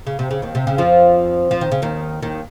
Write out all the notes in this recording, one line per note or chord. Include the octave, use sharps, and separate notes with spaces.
C#3
C3
C#3
D#2 D#3
C3
C#3
F2 F3
F3
D#3
C#3
D#2 D#3
D#2 D#3